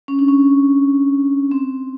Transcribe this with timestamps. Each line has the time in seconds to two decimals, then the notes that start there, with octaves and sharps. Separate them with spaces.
0.08 C#4
0.19 D4
0.28 C#4
1.51 C4